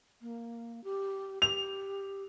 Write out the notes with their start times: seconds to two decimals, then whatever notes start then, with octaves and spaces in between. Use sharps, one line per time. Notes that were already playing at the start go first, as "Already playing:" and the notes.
0.22 A#3
0.84 G4
1.42 G4 F7